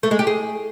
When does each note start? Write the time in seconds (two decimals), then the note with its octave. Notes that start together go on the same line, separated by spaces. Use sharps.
0.03 A3
0.11 G#3
0.19 G4
0.27 G#4